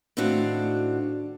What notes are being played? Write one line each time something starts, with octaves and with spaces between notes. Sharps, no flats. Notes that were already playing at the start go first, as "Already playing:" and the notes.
A2 D#3 C4 D4 F#4 F5